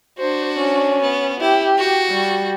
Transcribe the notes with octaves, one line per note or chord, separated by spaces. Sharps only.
D4 F#4 C5
C#4
B3
E4 G4
F#4
G3